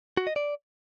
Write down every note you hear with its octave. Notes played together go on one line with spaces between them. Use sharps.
F#4
D#5
D5